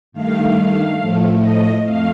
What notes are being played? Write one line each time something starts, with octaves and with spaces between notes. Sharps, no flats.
G2 D#3 A3 F5
A2 F3 A3
D#5
F2 A3 F5